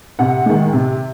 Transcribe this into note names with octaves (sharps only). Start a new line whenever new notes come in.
C3 F#5
D#3 G#3
C3